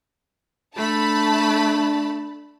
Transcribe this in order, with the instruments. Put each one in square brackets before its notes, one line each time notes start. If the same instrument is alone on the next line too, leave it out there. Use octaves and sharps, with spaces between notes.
[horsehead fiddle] A3 [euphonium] D4 [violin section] A5 B5